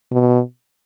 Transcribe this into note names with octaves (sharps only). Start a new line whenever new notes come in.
B2